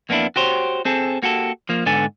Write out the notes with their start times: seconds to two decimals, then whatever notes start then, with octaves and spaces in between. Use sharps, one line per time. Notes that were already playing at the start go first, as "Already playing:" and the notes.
0.09 F2 A#3 B3 C#4 D4 E4
0.36 F#4 G4 C5 C#5
0.85 C4 G#4 A4
1.23 A#3 F#4 G4 A4
1.69 F3 A#3
1.86 G#2 D3 B3 A4 G#5